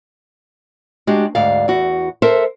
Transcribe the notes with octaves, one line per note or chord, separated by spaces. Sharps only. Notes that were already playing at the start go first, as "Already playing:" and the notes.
G#3 D4 F#4 G4
D2 G#2 D5 F5
E2 F#4
A4 A#4 C5 E5